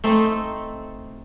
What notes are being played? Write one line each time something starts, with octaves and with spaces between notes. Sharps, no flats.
A3 C4 D#4 A4